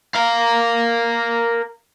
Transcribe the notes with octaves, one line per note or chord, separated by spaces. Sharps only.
A#4 F5